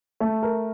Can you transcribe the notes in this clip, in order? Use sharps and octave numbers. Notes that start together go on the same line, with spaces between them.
A3
A#4